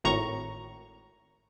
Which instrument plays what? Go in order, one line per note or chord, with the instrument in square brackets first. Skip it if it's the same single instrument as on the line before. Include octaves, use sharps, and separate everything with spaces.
[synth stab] G#1 A2 A#5 C#6